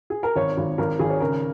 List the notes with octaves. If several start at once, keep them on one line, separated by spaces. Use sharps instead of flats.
G#4
A#4
G#1 C#5
G#1
G#1 A#4
G#1 G#4
C#5
C#3 A#4